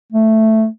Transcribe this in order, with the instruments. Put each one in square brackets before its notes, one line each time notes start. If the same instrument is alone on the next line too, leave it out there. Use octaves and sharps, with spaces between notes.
[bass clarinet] A3